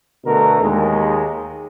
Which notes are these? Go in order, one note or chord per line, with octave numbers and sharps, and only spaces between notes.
B2 D3 A3 A#4
D#2 G#3